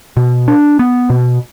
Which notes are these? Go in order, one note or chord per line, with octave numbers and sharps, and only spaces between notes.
B2
D4
B3
B2